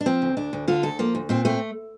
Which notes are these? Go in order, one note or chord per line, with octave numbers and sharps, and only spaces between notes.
D4
F3 C4
D2
D2 D4
D2
D3 F4
D2 A4
F3 A#3
D2
A#2 C4
A3 C4